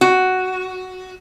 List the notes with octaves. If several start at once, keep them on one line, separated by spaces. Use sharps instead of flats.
F#4